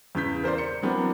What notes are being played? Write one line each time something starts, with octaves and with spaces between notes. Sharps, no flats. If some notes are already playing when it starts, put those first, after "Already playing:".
E2 C#3 G6 B6
A#4 C5 D5 C6
C#7
E3 F#3 B3 C4 D4 A#4